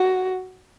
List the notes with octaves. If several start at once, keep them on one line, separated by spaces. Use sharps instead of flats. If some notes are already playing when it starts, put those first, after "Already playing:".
Already playing: F#4